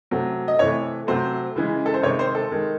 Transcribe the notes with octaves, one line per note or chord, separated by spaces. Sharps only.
C3 F#3 A3
D#5
C3 E3 A3 C#5
C3 F#3 A3 C5
C#3 E3 G#3
A4
C5
C3 D#3 G#3 C#5
C5
A4
D#3 G#3